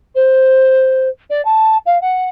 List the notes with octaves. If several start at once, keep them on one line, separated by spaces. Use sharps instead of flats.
C5
D5
A5
F5
F#5